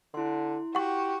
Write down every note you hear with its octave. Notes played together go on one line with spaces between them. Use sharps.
D3 E4 C6
F#4 G4 F#5 C#6